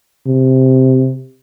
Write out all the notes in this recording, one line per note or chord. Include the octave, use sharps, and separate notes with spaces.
C3